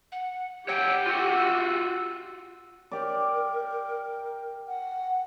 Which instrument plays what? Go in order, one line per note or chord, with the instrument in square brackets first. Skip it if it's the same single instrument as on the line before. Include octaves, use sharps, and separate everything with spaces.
[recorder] F#5
[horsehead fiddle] G4 [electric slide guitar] C#5 F#5 G5 [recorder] E6
[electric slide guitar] F4 F#4 F#5
[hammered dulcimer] G4 D5 [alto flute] A#4
[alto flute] F#5